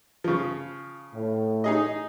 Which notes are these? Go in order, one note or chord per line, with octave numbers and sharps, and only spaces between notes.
C#3 F3
A2
D#4 G#4 D#5